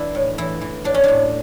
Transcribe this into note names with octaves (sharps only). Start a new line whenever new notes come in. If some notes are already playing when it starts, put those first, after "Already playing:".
Already playing: E3 D4 E4
A2
E3 E4
E3
A2 D4
C#4
A2 D4